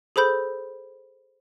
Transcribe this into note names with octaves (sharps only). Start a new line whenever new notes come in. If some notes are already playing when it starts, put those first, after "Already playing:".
G#4 A4 C5 B5 G6